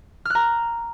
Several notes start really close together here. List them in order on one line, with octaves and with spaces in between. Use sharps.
F6 F#6 A#5